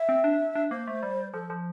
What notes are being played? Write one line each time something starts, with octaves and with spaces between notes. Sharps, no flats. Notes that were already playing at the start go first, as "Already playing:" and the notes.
Already playing: E5
C4
D4
D4
A#3 C5
A3
G3
F3 A4
F3